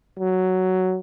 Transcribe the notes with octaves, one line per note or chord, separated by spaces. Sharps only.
F#3